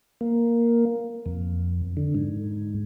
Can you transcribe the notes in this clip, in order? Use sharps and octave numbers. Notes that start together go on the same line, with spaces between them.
A#3
F2
D3
G#2